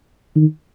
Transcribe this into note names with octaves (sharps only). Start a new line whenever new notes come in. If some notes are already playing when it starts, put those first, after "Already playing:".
D#3